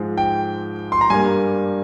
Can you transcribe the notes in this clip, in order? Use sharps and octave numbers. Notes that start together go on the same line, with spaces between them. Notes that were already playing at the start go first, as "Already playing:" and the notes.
Already playing: G#2 F3 G#3
G5
C6
A#5
G2 G3 A#3 G#5